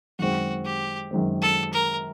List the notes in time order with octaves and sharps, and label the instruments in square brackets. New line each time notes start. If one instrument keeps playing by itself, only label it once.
[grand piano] F#2 D#3 G#3 C4 [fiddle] F#4
[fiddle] G4
[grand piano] F#2 D#3 G#3 C4
[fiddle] A4
A#4